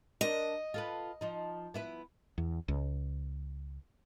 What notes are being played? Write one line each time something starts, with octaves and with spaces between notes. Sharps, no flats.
D4 A#4 C5 D#5
F4 A4 B4
F3 D#4
B3 E4 B4
E2
C#2